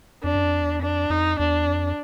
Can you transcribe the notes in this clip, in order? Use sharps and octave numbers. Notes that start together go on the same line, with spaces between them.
F2 D4
F#2
F2
E2
F2 D4
F2 D#4
E2 D4
F2